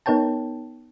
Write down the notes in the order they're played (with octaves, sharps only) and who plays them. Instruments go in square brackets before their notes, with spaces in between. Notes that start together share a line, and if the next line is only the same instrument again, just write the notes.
[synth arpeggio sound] B3 D#4 A#4 C#5 G5 A5